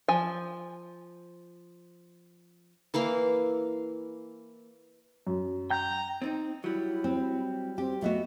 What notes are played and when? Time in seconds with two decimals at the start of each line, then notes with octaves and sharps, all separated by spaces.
0.08 F3 G#5
2.94 E3 A#3 E4 F5
5.27 F#2
5.71 G5 A#5 G6
6.22 C4 D4 D#4
6.64 F#3 G3 E4
7.04 C4
7.78 C4 G4
8.02 A3 B3 F#4 D#5